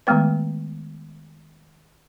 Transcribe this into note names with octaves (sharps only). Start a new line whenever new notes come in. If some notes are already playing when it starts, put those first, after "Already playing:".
D#3 G#3 A3 B3 B4